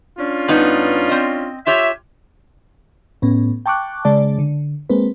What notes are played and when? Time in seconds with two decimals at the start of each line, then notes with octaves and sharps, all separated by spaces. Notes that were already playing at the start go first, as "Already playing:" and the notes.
0.18 C#4 D4 F4
0.48 G2 B3 D#4
1.09 C4 D#5
1.67 F4 G4 C#5 E5
3.22 A2 B3 C#4
3.66 G5 A5 C#6 D6 F#6
4.05 C#3 G#3 D5 A5
4.39 D3
4.90 G#3 A#3 C4 B4